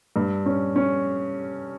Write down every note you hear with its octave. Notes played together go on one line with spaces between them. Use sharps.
G2
C#4
C#4